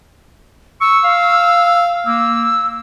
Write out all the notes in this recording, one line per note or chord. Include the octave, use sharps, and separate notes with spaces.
C#6 E6
F5
A#3 E6